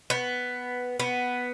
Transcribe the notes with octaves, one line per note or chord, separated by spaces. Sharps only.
B3
B3